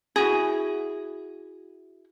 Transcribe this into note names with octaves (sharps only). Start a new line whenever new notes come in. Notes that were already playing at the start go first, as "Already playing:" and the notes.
E4 F#4 G#4